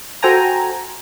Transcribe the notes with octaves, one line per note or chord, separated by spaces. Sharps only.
F#4 A4 C5 G5 G#5 A#5